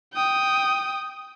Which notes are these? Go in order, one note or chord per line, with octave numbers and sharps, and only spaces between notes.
G5 D#6